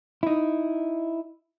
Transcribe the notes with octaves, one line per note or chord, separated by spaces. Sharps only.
D#4 E4